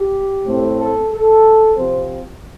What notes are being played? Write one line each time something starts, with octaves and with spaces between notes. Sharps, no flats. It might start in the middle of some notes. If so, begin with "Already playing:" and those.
Already playing: G4
A2 A3 C4
A4
A4
C3 F3 C4 C5